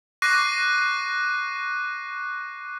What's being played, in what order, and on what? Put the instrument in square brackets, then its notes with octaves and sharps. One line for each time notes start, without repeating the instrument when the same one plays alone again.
[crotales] C#6 D6 F#6 A#6 C7 D#7